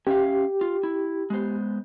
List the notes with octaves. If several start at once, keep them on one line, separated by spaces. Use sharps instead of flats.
C#4 G4 E5 F5
F4
E4
G#3 B3 C5